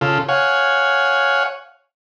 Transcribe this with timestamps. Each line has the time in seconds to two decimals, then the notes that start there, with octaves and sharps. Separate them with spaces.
0.01 C#3 F4 A4
0.29 C#5 F5 F#5 G#5